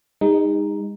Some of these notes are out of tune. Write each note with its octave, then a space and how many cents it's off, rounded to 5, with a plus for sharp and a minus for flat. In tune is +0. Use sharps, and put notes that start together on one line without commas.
G#3 -40 D#4 +0